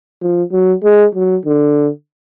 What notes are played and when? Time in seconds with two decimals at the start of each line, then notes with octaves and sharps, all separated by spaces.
0.22 F3
0.52 F#3
0.84 G#3
1.15 F#3
1.46 D3